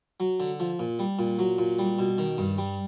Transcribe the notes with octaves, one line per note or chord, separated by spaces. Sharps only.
F#3
D3
F3
A#2
G3
A#2
F#3
A#2
G3
B2
D#3
G2
G3